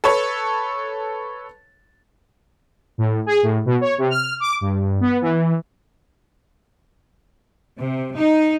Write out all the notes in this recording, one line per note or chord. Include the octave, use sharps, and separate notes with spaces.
A4 B4 C#5
A2
G#4
A2
B2
C#5
C3
F6
D6
G2
B3
E3
C3
D#4